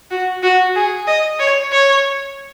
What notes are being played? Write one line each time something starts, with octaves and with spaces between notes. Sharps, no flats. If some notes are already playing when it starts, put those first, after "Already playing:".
F#4
F#4
G#4
D#5
C#5
C#5